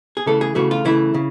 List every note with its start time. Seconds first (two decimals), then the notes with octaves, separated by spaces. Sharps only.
0.17 G#4
0.26 C#3 E3 A3 A4
0.41 G#4
0.55 C#3 E3 A3 F#4
0.71 F4
0.85 C#3 E3 A3 E4
1.14 C#3